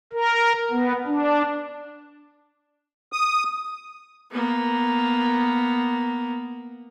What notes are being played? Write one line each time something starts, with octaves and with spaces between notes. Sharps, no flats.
A#4
B3
D4
D#6
A#3 B3